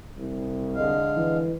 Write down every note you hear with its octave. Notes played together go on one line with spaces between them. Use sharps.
C2
D3 G#3 F5
E3